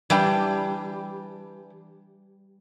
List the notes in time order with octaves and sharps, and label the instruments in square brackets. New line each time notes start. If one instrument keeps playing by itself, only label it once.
[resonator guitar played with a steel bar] E3 D4 G5 [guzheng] G3